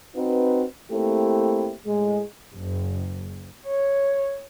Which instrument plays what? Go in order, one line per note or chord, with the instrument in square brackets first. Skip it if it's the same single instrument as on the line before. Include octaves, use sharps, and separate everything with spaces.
[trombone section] C4 D#4 F#4 B4
A3 A#3 C4 E4 G4
A2 G#3
[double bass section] F#1
[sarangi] C#5